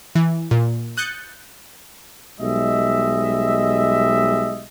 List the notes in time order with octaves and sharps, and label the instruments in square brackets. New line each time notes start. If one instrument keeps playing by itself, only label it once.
[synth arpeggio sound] E3
A#2
D#6 F#6 G6 A6 C#7
[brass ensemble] B1 G3 G#3 D#5 E5